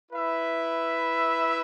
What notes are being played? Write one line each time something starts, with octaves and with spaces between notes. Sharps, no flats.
E4 B4 E5